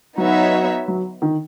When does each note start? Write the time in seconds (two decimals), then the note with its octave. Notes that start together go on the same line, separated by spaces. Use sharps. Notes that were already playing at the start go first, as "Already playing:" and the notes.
0.17 F#3 B3 D#4 F#4 C#5 E5
0.88 F#3
1.22 D#3